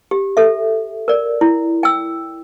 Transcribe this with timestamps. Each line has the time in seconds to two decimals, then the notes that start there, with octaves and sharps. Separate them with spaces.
0.11 G4
0.37 A4 E5
1.08 A#4 D5
1.41 E4
1.83 G5 E6